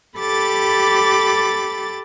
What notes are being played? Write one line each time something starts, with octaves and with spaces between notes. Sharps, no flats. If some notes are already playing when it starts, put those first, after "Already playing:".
G4 A4 B5 D6 A6